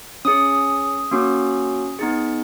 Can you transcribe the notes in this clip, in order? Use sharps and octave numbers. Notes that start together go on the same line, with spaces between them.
C#4 G#4 D#6
A#3 C#4 F#4
B3 D#4 G#4